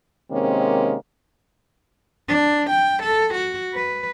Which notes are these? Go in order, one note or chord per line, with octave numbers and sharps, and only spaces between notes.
C3 D#3 G#3 A#3 C4 C#4
D4
G5
A4
F#4
B4